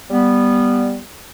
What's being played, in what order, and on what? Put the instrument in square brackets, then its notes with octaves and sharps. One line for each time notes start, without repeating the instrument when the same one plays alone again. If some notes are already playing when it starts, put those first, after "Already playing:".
[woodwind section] G3 B3